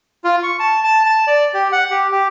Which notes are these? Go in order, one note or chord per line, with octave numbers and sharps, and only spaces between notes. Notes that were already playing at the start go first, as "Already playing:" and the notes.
F4
C#6
A5
A5
A5
D5
G4
F#5
G4
G4